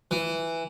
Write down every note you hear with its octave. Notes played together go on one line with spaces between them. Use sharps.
E3